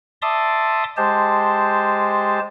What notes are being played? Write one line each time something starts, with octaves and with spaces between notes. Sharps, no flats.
D5 E5 A5 C6 D6 D#6
G#3 G4 C5 A5